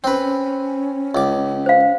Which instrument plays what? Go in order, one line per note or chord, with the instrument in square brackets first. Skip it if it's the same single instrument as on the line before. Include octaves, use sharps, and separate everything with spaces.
[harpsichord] C4 B4 [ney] C#4
[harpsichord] C#2 D6
[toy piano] C5 F5